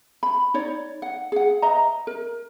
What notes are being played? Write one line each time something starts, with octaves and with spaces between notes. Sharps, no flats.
B5
D#4 C#5 D5
F#5
G#4 F#5
B4 D#5 E5 A#5
A#4